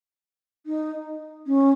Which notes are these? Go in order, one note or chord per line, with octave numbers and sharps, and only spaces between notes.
D#4
C#4